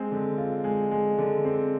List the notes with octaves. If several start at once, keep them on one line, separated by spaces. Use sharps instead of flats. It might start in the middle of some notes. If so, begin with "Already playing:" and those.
Already playing: G#3 C4
D3
F4
G#3
G#3
D3
C4